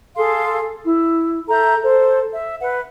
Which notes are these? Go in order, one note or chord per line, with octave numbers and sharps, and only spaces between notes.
G#4 A4 F5 C6
E4
A4 E5 A#5 G6
A4 C5
E5
B4 F#5